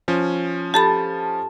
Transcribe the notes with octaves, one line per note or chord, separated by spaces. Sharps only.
F3 C#4
G4 A4 A5 B5